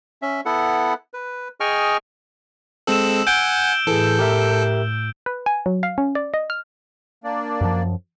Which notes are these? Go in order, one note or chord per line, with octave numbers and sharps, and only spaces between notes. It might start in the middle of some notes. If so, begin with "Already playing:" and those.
C#4 E5
B3 E4 A4 F#5
B4
G#4 D#5 G5 G#5 C#6 F6
G#3 C4 A4 E6 E7
F#5 G#5 G6 D7 G7
A2 E3 G#4 A4
G4 A#4 E5
B4
G#5
F#3
F5
C#4
D5
D#5
F6
A#3 D4 D5
F#2 F3